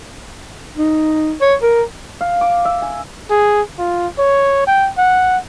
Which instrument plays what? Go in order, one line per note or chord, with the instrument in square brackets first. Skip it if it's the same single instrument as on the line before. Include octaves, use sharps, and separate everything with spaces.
[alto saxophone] D#4
C#5
A#4
[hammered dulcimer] F5
D6
E5
G#5
[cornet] G#4
F4
C#5
G5
F#5